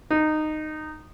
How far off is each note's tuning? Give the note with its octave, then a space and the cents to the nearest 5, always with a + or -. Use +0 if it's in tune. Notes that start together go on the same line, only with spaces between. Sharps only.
D#4 -15